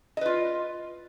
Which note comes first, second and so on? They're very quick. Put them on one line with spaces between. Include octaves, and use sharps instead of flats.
D#5 B4 F4